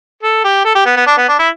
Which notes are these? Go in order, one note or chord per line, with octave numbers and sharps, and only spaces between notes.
A4
G4
A4
G4
B3
B3
D4
B3
D4
E4